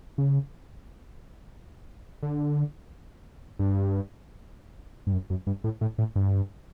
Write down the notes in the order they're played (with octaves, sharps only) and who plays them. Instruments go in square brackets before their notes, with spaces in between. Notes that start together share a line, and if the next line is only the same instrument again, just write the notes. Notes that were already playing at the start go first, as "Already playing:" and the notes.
[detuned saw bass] C#3
D3
G2
G2
F#2
F#2
G2
A2
A2
A2
G2